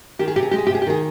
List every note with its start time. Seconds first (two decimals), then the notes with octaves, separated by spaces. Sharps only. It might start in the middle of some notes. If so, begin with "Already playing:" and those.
0.19 D#3 G4
0.28 G#4
0.36 C3 G4
0.43 G#4
0.51 G#3 G4
0.58 G#4
0.67 G4
0.70 C3
0.75 G#4
0.82 G4
0.87 D#3 G#4